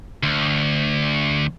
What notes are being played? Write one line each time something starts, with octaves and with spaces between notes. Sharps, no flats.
D2